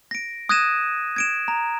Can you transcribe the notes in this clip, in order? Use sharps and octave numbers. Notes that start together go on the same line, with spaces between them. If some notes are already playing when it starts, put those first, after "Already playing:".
A#6 D7
D#6 F#6 G#6 A#6 D#7 E7
G#6 D7 E7
A#5